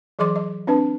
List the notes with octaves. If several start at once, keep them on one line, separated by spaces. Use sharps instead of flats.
E3 F#3 G#4 D#5 C6 D6
D#5
C4 D4 B4 A5